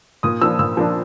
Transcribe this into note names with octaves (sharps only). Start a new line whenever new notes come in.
A#2 D#6
F3 A#3 D4 E6
A#2 E6
F3 A#3 D4